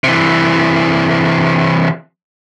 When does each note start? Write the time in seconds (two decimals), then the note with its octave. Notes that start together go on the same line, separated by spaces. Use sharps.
0.04 C3 E3